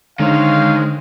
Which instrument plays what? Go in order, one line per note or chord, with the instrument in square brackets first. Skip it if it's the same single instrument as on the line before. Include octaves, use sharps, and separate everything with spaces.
[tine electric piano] D3 [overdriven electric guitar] D#3 [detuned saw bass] G#3 [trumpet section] C5 C#5 F5